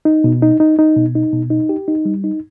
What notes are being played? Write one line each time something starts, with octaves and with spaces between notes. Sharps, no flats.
D#4
B2
D#4
D#4
D#4
B2
D#4
B2
D#4
G4
D#4
G3
D#4